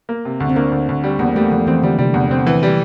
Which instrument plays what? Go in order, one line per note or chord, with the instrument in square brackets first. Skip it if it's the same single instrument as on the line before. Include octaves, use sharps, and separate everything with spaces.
[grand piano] A#3
C3
D2
[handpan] C4
[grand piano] A#3 [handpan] D4
[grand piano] D2
D2
G3
[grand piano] E2 [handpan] A#3
[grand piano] G3 [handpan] A3
[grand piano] E2 [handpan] F3
[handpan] E3 [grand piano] C4
[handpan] D3 [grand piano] G3
[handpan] C3 [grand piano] G3
[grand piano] E2 [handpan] C3
[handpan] C3 [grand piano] C4
[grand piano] E3
G3